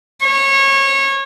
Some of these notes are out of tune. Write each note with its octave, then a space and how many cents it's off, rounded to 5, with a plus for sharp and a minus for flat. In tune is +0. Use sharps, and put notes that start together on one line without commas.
C#5 -20